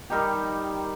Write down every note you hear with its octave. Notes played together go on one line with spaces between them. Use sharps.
D#3 G3 D#4 G4